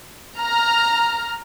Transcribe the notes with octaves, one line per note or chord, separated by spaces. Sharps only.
A#5 F6